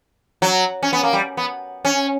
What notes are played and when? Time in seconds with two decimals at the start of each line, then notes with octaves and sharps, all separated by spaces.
0.42 F#3
0.83 C#4
0.93 B3
1.03 A#3
1.13 G3
1.37 B3
1.85 C#4